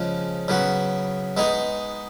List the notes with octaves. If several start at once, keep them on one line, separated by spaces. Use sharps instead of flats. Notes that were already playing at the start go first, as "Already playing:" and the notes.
Already playing: C#3 F3 G#3
C#3 F#3 B3 F#4
G#3 B3 D#4 G#4